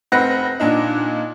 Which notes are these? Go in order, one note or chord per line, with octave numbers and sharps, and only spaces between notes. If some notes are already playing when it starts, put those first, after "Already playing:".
F1 C4 B4 F#5 F#6 A#6
A#2 D4 D#4